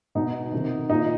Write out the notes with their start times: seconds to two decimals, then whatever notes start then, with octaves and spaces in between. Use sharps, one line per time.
0.15 B2 D#4
0.52 C3 D#3
0.90 A#2 D#4